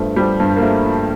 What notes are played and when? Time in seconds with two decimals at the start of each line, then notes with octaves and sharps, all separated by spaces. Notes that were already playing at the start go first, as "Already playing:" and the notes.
Already playing: G2 F3 A3
0.16 F3 G3
0.40 G2
0.57 A#3
0.62 F3 A3
0.86 F3